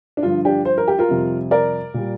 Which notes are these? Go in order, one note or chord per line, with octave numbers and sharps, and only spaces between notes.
D4
G2 D3 F3 F4
D4 G4
C5
A#4
G4
F4 A#4
F2 C3 G3
A#4 D5
A#2 G3